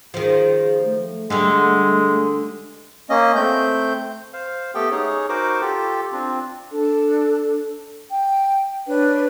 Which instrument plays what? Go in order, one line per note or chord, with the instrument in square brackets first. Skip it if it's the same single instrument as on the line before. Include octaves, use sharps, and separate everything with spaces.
[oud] D#3 F3 [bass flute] G#4
[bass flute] A3
[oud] D3 G3 [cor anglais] G#3
[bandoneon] A#3 C#4 D#5
A3 C4 G6
[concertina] C5 F5
A3 B3 G4 A4 G5
C#4 D#4 G#4 C#5
D#4 F#4 A#4 C5 D6
F4 G4 A4
C4 D4 F4
[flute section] D4 A4
G5
D4 B4 C#5